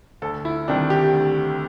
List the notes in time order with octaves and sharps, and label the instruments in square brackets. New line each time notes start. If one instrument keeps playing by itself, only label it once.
[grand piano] D2 A4
E4
C3 D#3 G3 D4
G4
D2